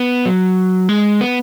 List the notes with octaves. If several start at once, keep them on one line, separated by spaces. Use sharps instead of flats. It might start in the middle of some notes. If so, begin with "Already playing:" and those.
Already playing: B3
F#3
G#3
B3